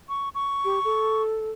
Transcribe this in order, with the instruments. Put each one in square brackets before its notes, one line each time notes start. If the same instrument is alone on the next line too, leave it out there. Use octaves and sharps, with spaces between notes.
[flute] C#6
C#6
[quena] G4
A4